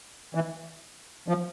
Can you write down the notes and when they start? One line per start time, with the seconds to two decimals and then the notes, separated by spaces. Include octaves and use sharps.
0.35 E3
1.28 F3